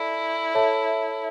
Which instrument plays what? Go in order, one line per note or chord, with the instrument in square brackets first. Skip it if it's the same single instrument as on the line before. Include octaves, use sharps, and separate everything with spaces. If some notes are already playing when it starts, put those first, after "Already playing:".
Already playing: [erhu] E4 [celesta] A4 D5 A5
[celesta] A4 C#5 E5 A5